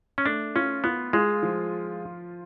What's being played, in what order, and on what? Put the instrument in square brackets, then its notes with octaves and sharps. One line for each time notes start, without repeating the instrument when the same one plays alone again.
[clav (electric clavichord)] C#4
[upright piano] A3 [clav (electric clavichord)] D4
[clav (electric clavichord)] C#4 [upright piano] F4
[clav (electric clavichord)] B3 [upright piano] F4
[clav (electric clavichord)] G#3 [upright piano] F4
[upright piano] F3